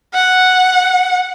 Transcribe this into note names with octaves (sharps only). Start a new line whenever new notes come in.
F#5